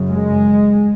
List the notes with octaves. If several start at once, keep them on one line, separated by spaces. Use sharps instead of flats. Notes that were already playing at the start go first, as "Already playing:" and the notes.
Already playing: F#2 C#3
G#3